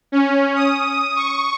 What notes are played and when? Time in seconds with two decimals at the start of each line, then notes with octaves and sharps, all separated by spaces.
0.12 C#4
0.56 D#6
1.16 C#6